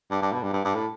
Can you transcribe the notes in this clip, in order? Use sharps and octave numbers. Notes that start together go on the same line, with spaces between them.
G2
G2
B2
G2
G2
G2
A2